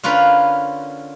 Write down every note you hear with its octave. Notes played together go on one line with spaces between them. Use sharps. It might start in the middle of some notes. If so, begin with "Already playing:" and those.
D3 C#4 F4 A#4 B4